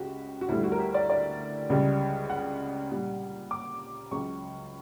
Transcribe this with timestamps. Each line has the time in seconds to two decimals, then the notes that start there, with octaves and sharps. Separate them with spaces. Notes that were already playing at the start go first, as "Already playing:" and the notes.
Already playing: C#2 C#3 F#4 G4
0.41 F#4
0.48 D2 D3 G3 E4
0.63 F#4
0.72 A#4
0.79 G4
0.94 D5
1.10 D5
1.70 C#2 C#3 G3
2.30 F#5
2.90 A#2 G3
3.51 D6
4.11 C#2 C#3 F#3 C#6